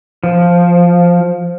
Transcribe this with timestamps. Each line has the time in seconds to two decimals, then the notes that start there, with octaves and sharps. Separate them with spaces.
0.24 F3